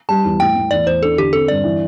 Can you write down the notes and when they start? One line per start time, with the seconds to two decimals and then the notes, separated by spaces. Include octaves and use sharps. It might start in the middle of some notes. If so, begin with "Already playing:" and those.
0.09 G3 A5
0.25 E2
0.40 A2 G5
0.55 A2
0.71 E2 D5
0.86 E2 C5
1.03 D4 A4
1.18 D3 G4
1.33 C4 A4
1.48 G2 D5
1.64 E3